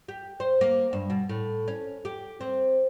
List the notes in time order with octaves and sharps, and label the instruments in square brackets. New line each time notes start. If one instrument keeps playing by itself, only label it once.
[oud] G4
C5
A#3
G2
B2
A2
C#4
G4
C4